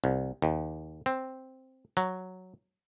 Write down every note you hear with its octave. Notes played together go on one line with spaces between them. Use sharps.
C2
D#2
C4
F#3